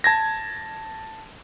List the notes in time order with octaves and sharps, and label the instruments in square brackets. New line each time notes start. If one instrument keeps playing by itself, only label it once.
[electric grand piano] A5 G#6 A#6